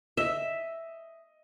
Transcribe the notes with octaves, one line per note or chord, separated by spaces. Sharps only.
D#5 E5